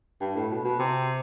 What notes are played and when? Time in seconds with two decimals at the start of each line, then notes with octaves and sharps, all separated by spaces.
0.20 G2
0.35 A2
0.50 B2
0.65 B2
0.79 C3